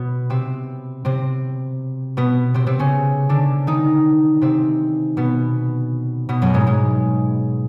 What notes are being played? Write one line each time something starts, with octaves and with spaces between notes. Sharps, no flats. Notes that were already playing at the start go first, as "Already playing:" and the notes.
Already playing: B2 B3
C3 C4
C3 C4
B2 B3
C3 C4
C3 C4
C#3 C#4
D3 D4
D#3 D#4
C3 C4
B2 B3
B2 B3
F#2 F#3
G#2 G#3
G#2 G#3